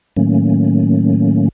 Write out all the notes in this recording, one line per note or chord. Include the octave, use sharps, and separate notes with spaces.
A2 D#3 F#3 A3 A#3 C#4